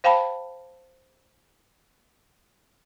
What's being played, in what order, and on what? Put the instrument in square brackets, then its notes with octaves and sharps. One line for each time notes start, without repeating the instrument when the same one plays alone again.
[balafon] C5 F5 G5 A5 B5